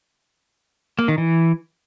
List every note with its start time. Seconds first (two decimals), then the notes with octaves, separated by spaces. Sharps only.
0.99 A#3
1.08 D#3
1.18 E3